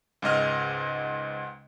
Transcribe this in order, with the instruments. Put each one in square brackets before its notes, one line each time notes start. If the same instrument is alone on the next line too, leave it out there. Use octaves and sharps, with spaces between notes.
[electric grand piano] C#2 G#2 D#5 F6